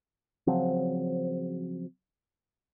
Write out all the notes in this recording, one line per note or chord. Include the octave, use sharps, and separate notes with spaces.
C#3 F3 F#3 C4